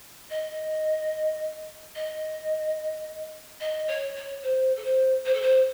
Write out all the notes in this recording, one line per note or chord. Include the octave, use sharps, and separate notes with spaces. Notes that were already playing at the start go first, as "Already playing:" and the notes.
D#5
D#5
D#5
C#5
C#5
C5
A4
C5
C5
A4
C5